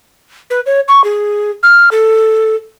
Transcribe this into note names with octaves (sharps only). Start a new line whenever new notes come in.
B4
C#5
C#6
G#4
F6
A4